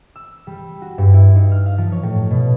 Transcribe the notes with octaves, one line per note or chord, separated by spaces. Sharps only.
E6
G3
F#4
G2
E4
D#4
F6
F5
F3
C#5
A2
B2